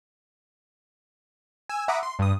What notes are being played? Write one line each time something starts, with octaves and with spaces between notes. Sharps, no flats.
G#5 E6
E5 F#5 A#5 B5 D6 D#6
C6
G2 D#6